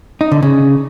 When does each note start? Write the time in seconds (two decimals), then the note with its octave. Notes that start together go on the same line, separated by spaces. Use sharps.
0.21 D#4
0.32 D3
0.43 C#3